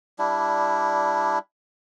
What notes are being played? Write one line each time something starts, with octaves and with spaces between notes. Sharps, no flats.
G3 D4 E4